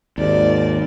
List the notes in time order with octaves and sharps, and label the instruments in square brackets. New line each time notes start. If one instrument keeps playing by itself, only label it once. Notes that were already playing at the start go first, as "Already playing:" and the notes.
[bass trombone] G#1 [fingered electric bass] D#2 [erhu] D5